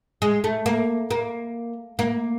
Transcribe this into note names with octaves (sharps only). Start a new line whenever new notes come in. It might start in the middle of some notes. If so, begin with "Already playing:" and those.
G#3
A3
A#3
A#3
A#3